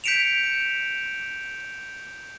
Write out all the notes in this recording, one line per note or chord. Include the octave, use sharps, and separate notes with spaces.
G6 B6 C#7 D7 E7 F7